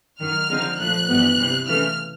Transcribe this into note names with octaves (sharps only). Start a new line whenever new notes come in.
F#2 D#3 F#3 F6
D3 F3 G#3 C4 D#4
A#2 F3 A3 F#6
G2 E3 G3 B3
C3 E3 G3
C#3 E3 A3 F6